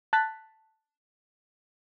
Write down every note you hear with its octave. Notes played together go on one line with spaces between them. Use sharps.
A5 F#6 A6 B6